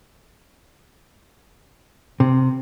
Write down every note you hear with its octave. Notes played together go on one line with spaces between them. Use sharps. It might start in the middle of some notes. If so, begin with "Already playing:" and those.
C3